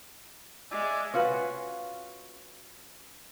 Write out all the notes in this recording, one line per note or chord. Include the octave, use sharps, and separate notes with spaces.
G#3 D5 E5 G#5
C#4 F4 F#4 B4